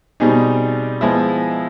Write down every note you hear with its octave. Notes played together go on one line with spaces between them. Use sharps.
B2 G3 C4 D#4 G#4
F3 G#3 B3 E4